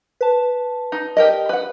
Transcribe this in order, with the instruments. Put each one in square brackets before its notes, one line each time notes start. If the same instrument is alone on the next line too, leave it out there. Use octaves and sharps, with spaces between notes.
[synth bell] B4 A5
[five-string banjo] D#4
G4 A#4 D#5
B4 F#5